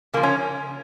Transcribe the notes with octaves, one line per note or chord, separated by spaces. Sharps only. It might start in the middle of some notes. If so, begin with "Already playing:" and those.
C#3 F3 A#3
C#4